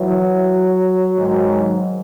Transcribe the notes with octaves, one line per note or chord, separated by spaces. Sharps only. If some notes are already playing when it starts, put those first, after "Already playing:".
Already playing: E3 F#3
G#2 D#3